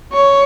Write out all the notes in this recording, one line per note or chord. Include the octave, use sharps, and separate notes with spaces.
C#5